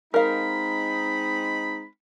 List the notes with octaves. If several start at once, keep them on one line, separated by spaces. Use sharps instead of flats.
G#3 C4 D#4 A#4 F5 B5